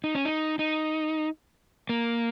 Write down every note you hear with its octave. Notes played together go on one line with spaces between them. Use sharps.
D#4
C#4
D#4
D#4
A#3